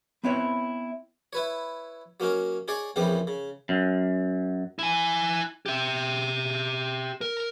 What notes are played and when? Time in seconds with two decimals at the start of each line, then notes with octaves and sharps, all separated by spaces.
0.24 B3 C4 E4 B4 C#5 E5
1.33 E4 B4 C#5
2.20 F#3 A#3 C#4 D#4 A#4
2.68 D#4 G#4 C#5 D5
2.96 A#1 F2 C#3 E3 G3 G4
3.27 C#3
3.69 F#2
4.79 E4 G#5
5.66 G4 E5
7.21 A#4